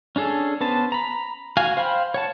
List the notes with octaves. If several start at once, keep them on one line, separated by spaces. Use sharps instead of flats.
C#4 D4 G#4 A4
B3 C#4 B4 C5 A5
A#5 B5
F#4 F5 G#5
C5 F5 G5 B5
C#5 F#5 A5